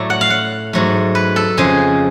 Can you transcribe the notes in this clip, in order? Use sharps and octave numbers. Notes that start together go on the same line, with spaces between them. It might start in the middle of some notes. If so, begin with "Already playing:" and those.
Already playing: A2 F#3 A3 D5
F#5
F5
F#5
G#2 F#3 A3
B4
A4
F2 C#3 F3 G#3 G#4